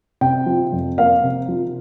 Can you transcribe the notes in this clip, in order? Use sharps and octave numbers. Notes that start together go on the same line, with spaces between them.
C3 G5
F3
F2
A#3 F5
C3
F3